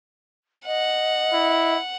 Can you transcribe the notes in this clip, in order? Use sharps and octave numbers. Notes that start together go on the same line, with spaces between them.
D#5 F#5
E4